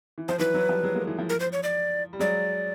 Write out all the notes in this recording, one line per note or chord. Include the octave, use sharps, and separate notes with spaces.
E3
F3 C5
E3 F#3 B4
E3 F#3
F3 G3
F#3 G#3
G#3 A#3
E3
F3
A#4
C5
C#5
D5
G3
F#3 G#3 D5